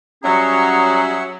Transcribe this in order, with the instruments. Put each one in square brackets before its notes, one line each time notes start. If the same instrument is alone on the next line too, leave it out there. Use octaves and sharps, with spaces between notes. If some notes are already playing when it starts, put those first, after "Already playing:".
[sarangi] F#3 [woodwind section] G3 C#4 G#4 [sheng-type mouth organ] C#5 E5 F#5 [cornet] A#5